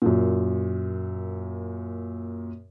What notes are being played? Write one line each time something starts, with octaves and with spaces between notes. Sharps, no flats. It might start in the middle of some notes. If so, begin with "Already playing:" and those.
F#2 A#2